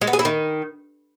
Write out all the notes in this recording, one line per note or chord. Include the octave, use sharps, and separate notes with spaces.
G#3
B3
G#4
E4
D#3